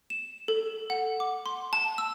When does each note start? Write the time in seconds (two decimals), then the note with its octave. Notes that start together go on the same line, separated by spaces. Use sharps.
0.10 E7
0.48 A4
0.90 F#5
1.20 D6
1.46 C6
1.73 A5
1.98 E6